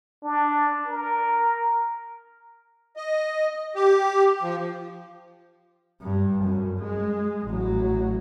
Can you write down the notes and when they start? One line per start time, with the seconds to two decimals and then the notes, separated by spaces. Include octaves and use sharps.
0.23 D4
0.88 A#4
2.96 D#5
3.75 G4
4.42 F3
6.02 G2
6.44 F#2
6.80 G#3
7.47 A1 F#3